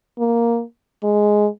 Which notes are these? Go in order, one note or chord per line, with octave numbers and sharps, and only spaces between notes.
A#3
G#3